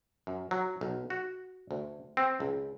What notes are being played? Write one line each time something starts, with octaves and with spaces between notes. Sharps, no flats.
F#2
F#3
B1
F#4
D2
C4
C#2